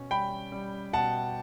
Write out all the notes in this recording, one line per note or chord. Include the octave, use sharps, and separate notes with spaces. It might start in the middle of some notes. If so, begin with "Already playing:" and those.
Already playing: B2 C#4
G3 G5 B5
G3
B2 F#5 A5